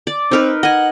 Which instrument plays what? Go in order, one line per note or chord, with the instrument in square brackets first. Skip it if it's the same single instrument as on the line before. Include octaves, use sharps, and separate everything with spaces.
[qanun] D5
[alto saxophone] C4 [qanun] D#4 A#4 B4
[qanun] D#5 G#5 [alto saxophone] F#5